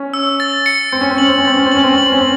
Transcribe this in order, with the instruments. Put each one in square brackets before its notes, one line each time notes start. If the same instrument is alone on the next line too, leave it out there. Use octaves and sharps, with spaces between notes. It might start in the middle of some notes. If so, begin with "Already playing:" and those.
Already playing: [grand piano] C#4
[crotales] E6
A6
C#7
[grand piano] C4 [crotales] C#7
[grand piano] C#4
C4
[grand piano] C#4 [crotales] F#7
[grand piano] C4
C#4
[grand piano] C4 [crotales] A6
[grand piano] C#4
C4
[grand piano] C#4 [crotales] F#7
[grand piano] C4
C#4
[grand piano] C4 [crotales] F#7
[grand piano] C#4
C4